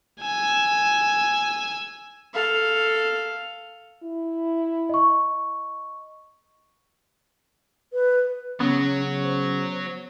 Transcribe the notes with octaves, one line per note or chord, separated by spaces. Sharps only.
G#5 E6
A4 F5
E4
D#5 C#6
B4
C#3 F#3 B3 C#4
C5